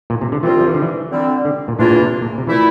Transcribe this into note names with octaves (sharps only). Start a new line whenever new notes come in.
A#2
C3
D3
C2 C3 E3 G3 C4 F4
F3
E3
D3
E3
D3 G3 C4
D3
A#2
E2 A2 E3 A#3 D4 F4
A#2
C3
A#2
C3
A#2 E3 A3 E4